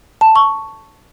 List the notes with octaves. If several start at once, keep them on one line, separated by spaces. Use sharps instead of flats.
A5
C#6